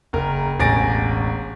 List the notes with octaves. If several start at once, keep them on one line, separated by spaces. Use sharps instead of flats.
F#1 A#4
E1 A1 G#5 A6 A#6 D7